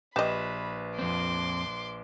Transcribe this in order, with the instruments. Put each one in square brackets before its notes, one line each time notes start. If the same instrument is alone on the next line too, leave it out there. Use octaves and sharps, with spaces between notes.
[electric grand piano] A#1 B4 E7 [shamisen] G4 D#5 [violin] B5
[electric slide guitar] F2 C4 [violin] C6 D6